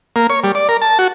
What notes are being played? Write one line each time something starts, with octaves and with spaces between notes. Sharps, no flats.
A#3
C#5
G3
D5
A#4
A5
F#4